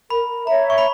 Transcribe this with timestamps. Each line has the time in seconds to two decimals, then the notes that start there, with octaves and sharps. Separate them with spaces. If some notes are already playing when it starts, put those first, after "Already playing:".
0.10 A#4 B5
0.47 C#5 E5 A#5
0.70 C#6
0.78 B5